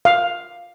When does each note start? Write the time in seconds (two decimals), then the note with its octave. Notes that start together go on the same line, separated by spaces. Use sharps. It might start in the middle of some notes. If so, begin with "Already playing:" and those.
0.05 F5